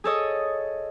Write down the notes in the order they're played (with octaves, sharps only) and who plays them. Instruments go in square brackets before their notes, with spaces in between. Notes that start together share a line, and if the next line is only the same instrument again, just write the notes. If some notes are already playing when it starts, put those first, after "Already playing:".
[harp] G#4 A4 C#5 D#5